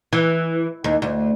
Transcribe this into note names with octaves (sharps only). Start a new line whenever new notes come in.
E3
D#2
D2